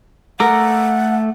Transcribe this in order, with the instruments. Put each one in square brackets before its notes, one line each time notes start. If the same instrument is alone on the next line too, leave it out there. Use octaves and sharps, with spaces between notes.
[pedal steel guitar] A3 A4 D6 [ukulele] A#4 [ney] F#5